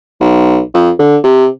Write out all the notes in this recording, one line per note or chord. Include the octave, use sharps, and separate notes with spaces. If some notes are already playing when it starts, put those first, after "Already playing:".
B1
F2
D3
C3